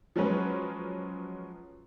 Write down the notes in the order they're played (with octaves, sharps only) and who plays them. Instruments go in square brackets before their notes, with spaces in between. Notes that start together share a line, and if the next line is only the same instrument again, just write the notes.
[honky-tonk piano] F3 F#3 G#3 C#4 B4